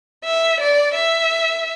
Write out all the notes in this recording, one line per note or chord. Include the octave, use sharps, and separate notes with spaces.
E5
D5
E5